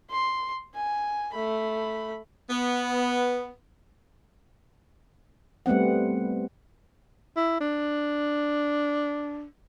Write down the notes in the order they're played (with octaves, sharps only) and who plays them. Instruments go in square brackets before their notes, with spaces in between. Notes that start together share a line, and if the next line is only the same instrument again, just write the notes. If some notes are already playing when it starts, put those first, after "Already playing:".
[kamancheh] C6
G#5
A3 B5
[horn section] B3
[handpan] G3 A3 B3 C4 F#5
[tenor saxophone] E4
D4